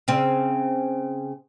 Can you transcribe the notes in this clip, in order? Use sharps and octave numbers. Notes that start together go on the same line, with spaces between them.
C#3 C4